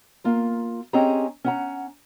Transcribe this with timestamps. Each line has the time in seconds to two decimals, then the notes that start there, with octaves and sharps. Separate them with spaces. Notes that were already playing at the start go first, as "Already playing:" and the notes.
0.24 A#3 F4 A#5
0.93 C4 C#4 G4 G#4 D#5 A#5
1.44 C#4 F#5 A#5